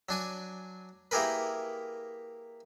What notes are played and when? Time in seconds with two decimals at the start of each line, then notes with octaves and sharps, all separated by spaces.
0.09 F#3 D4 G#5
1.11 A#3 E4 G4 G#4 A#4 B4